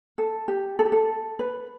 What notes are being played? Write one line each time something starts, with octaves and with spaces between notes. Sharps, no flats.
A4
G4
A4
G4
A4
B4